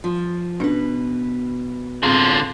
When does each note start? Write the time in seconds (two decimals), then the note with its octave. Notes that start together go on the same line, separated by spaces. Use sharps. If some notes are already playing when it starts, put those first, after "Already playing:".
0.04 F3
0.60 B2 C#4 D4 B4
2.03 A2 D3 C4 F4 G#4